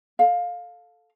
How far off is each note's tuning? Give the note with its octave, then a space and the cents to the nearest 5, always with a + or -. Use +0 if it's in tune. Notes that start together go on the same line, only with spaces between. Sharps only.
A4 +0 F5 +15